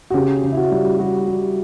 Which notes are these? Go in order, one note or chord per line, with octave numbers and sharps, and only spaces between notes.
F#4
C#3 G4
C#3
E4
F#4
G3
G3 F#4
G3